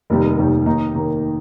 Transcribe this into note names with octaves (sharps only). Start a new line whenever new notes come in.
F1 D#2 D#3 G3 D#4
F1 D#2 D#3 G3 D#4
D#2 D#3 A#3 D#4
D#2 D#3 A#3 D#4